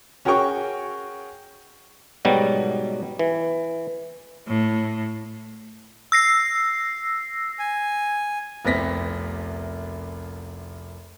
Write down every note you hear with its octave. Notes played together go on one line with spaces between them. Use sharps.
C#4 F#4 G#4 A#4 G5 C#6
G#2 B2 F#3 G3
E3
A2
E6 A#6 C7
G#5
F1 C2 B3 C4 A#6 B6